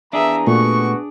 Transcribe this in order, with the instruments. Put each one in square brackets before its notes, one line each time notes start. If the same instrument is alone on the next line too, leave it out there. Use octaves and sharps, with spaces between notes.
[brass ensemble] E3 B3 A#5 [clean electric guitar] D4 G#4 [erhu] E5
[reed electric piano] A#2 A3 [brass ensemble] B3 F#4 [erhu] C#6